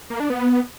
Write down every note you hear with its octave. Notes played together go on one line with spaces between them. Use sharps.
A#3
D4
B3